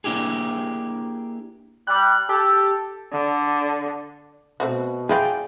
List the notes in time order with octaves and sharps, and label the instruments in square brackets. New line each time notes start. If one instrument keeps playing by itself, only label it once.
[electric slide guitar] A#3 D4 E4 G4 G#4
[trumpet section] G3 [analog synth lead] F#6
[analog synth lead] G4 [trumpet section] A4
[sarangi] D3
[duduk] B2 [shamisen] A3 C4 F#4
[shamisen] G#3 E4 F4 [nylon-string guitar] G#4 [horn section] A4 D5 G5